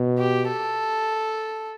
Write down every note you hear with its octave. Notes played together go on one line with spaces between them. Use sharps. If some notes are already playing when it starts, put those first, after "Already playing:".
Already playing: B2
G4
A4